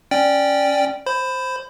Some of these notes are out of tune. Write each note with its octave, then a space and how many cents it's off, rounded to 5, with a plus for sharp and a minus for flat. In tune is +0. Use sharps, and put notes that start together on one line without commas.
C#4 +0 D5 +0 G5 +0
C5 +5 B5 +20